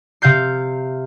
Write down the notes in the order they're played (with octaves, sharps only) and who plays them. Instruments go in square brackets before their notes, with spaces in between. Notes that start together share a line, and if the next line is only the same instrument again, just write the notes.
[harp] C3 F5 G6 C7